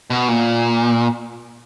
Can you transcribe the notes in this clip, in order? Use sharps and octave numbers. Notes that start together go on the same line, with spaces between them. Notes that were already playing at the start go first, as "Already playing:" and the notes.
B2
A#2